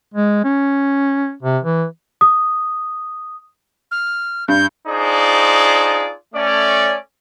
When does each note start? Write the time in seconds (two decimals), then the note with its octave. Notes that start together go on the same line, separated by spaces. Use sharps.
0.14 G#3
0.44 C#4
1.42 C3
1.63 E3
2.21 D#6
3.91 F6
4.48 G2 G6
4.88 D4 D#4 F4 G#4 C5 D5
6.35 A3 C#4 D5